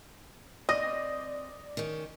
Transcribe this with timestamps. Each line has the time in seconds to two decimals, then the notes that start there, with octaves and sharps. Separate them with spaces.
0.69 C4 D5 D#5 D#6 A#6
1.77 D#3 C#4